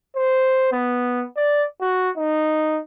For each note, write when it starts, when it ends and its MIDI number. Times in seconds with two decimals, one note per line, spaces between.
0.16 0.68 72
0.73 1.26 59
1.37 1.65 74
1.82 2.10 66
2.18 2.80 63